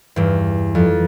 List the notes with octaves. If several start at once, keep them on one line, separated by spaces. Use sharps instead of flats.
E2 G2
F2